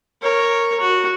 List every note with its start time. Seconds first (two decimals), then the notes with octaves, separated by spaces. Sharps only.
0.22 A#4 C#5
0.81 F#4